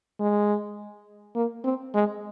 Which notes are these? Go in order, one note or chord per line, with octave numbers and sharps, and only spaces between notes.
G#3
A#3
C4
G#3